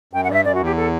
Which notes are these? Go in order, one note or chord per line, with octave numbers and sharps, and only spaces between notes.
F#2 G5
F#5
G2 D5 E5
F#2 D5
F#4
E2 G4
A4